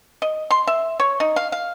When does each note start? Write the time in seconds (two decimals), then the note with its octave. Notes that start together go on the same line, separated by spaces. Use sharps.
0.22 D#5
0.51 C6
0.67 E5
1.00 C#5
1.20 D#4
1.36 F5
1.52 F5